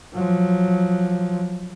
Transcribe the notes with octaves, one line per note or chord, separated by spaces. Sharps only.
F3 F#3